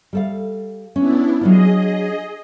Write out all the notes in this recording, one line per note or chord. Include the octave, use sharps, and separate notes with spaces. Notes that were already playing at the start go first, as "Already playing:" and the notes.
G3 A4 F5
B3 C#4 D4 E4
F#3 D4 F4 G#4 D#5